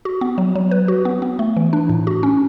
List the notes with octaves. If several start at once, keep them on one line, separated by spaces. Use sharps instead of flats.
F#4
B3
F#3
F#3
B4
F#4
B3
B3
A3
E3
D4
A2
F#4
C#4